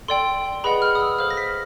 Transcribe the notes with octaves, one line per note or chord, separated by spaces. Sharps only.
A4 D5 G5 C6
G#4 B4 D#5 F#5 B5
F6
D#6
E6
A4 C5 F5 F6
A#6
B6